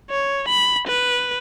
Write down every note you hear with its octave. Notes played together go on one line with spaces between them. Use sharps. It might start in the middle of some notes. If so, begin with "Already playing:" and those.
C#5
B5
B4